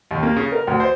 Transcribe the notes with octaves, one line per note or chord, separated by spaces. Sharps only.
D#2
A#3
C#3
A#4
D2
C5